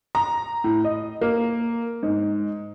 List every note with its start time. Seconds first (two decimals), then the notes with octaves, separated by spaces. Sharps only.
0.15 A#5
0.64 A2
0.84 D#5
1.21 A#3
2.03 G#2